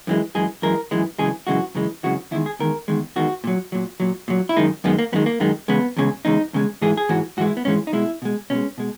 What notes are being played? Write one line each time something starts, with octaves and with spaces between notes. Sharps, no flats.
F#2 E3 G#3
F#2 E3 G#3 G#4
F#2 E3 G#3 A#4
F#2 E3 G#3
F#2 C#3 E3 G#3 G#4
F#2 C#3 E3 G#3 F#4
F#2 C#3 E3 G#3
F#2 C#3 E3 G#3 F#4
E2 D#3 G#3 E4
G#4
E2 D#3 G#3 A#4
E2 D#3 G#3
E2 D#3 G#3 F#4
A#2 F#3
A#2 F#3
A#2 F#3
A#2 F#3
E4
F#2 D#3 G#3 D#4
F#2 D#3 G#3 B3
A#3
F#2 D#3 G#3 B3
A#3
F#2 D#3 G#3
E2 C#3 G#3 B3
E2 C#3 G#3
E2 C#3 G#3 D#4
E2 C#3 G#3
G#2 E3 G#3 G#4
G#4
G#2 E3 G#3 F#4
G#2 E3 G#3 F#4
E4
B3
G#2 E3 G#3 C#4
D#4
B2 G#3 E4
B2 G#3
B2 G#3 C#4
B2 G#3